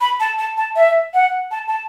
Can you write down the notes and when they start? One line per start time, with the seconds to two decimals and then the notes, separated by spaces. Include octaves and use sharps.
0.01 B5
0.20 A5
0.39 A5
0.58 A5
0.76 E5
1.14 F#5
1.51 A5
1.68 A5